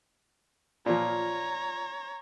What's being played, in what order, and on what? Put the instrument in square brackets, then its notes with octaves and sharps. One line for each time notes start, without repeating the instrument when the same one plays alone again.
[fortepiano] A#2 F3 [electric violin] C#5 A#5